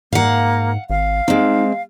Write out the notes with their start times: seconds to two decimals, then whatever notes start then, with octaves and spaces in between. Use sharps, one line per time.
0.13 G#2 A#3 F5 F#5
0.90 G#1 F5
1.28 G#3 C4 D#4